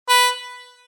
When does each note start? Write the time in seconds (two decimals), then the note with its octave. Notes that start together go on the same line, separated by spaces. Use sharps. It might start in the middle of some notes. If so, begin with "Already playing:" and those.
0.09 B4